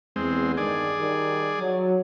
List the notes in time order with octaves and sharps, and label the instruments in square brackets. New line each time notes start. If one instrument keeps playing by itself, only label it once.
[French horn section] E2 [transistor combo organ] G#3 C4
[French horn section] G2 D#3 [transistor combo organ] G#4 D5
[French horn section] D#3 G3
F#3